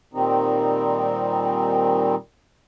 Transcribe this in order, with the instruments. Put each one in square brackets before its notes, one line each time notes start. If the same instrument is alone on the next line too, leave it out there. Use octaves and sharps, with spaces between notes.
[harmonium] A#2 D#3 G3 C4 D#4